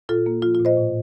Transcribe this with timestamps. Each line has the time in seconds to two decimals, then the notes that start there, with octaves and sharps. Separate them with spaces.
0.09 A#2 F4 A4
0.26 A#3
0.42 F3 F4
0.55 F4
0.59 A#2
0.65 C5 D#5
0.77 A2